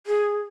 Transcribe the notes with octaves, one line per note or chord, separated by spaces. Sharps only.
G#4